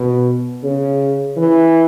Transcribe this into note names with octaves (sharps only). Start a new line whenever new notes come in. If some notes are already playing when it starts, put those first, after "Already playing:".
Already playing: B2
C#3
E3